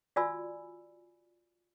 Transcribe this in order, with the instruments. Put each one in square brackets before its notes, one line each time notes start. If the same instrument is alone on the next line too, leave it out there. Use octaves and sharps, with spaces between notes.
[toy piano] F4 F#4 D5 G#5 B5 E6